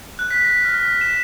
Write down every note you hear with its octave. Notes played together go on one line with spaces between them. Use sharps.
F#6
B6
A#6
F6
B6
E7